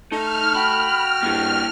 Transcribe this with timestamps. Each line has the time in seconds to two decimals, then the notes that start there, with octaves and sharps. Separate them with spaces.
0.12 A3 D#4 F6
0.55 F#4 G5 B5
1.23 G2 A#3 E4